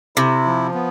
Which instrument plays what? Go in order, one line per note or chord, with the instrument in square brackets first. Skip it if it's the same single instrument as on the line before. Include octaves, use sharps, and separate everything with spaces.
[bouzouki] C3 [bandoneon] E4
[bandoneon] F3
B3